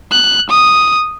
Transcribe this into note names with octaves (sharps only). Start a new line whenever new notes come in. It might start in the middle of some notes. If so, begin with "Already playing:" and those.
F#6
D#6